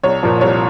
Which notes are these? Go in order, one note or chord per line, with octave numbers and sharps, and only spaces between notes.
C2 C#5
A#2 F3
C2 C#5